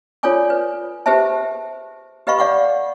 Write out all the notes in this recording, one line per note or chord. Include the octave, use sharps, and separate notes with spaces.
F4 A4 C#5 D5 G#5 D6
B4
G4 G#4 B4 C5 E5 A5
G4 B4 D#5 F5 B5 C#6
D5 F5 F#5 C#6 D6